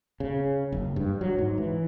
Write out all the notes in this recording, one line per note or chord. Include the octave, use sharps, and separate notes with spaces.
C#3
F#1
G2
F#3
G#2
E3